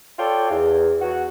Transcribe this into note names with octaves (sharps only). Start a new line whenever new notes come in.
F4 A4 C#5 D5 G5
E2
E2 F#4